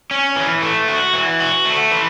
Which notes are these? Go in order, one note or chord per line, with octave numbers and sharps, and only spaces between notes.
C#4
E3
A3
F#4
E3
F#4
A3
E3